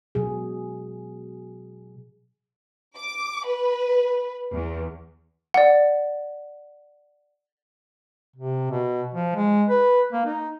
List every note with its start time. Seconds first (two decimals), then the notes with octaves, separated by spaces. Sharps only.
0.15 B2 F#3 G#4
2.96 D6
3.46 B4
4.53 E2
5.54 D5 F#5
8.36 C3
8.71 B2
9.14 F3
9.36 G#3
9.70 B4
10.12 A#3
10.25 D#4